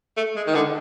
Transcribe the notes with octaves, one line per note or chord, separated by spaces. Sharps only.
A3
G#3
D#3
D3